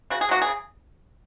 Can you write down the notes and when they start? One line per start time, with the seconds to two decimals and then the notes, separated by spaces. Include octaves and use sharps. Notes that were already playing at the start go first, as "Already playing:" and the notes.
0.10 C#3 F#4
0.21 G#4
0.29 F#3 A#3 F#4
0.42 G#4
0.46 C#3